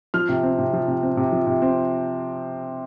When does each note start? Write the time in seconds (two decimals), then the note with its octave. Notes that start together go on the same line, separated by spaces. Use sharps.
0.14 F3 F6
0.29 C3
0.43 C4
0.59 C3
0.73 F3
0.88 C3
1.03 C4
1.17 C3
1.32 F3
1.47 C3
1.62 C4